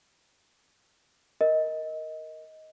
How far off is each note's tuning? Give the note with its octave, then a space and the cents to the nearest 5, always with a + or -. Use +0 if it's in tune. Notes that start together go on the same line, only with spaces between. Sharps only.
A#4 +0 D#5 +15